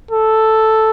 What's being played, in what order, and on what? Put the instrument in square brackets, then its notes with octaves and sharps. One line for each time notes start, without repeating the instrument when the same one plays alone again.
[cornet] A4